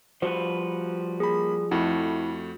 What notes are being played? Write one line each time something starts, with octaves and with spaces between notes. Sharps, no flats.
F3 G3 F#4 B4 C5
A#3 G#4 B5
F2 A3 E4 F#4